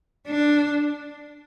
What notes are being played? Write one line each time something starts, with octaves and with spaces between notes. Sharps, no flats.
D4